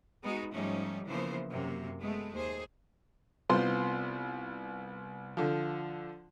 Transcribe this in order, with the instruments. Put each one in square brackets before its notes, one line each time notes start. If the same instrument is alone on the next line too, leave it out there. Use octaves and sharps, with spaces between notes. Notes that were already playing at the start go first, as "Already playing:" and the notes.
[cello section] G#3 B3 D#4 F#4
G#2 F3 G3 A3 C#4 D#4
C#3 E3 F3 A#3 B3 C5
F#2 C3 A#3
G#3 A3 B3
D#2 G#4 C5
[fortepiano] C2 B3 F4 C5 C6
D3 F3